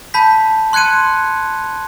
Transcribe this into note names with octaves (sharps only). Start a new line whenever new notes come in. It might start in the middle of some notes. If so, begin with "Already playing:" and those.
A5 B5 G6 B6
C6 F#6 G#6 C#7 D#7